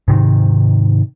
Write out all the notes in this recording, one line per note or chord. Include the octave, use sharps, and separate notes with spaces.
G#2 C3 D#3